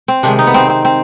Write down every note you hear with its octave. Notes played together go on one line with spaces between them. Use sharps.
C4
C3 D#3 G#3 D4
D#4
B3
C4
C4
C4